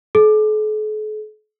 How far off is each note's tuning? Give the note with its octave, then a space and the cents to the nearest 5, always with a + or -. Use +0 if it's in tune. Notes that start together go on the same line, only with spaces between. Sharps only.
A4 -45